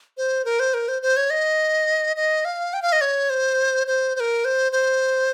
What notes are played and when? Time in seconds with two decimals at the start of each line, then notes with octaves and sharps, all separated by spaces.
0.17 C5
0.45 A#4
0.60 C5
0.74 A#4
0.88 C5
1.02 C5
1.17 C#5
1.30 D#5
2.16 D#5
2.45 F5
2.74 G5
2.82 F5
2.92 D#5
3.01 C#5
3.30 C5
3.87 C5
4.16 C5
4.20 A#4
4.45 C5
4.72 C5